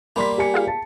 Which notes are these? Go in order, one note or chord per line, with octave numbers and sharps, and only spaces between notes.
G3 A#3 B5 C6 B6
G4 G#5 C#7
F4 G#4 F5
A5